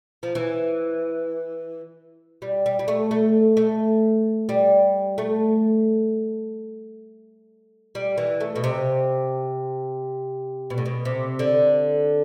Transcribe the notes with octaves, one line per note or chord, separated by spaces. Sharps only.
F3
E3
G3
G3
G3
A3
A3
A3
G3
A3
G3
E3
A3
B2
C3
B2
A2
B2
C3
D3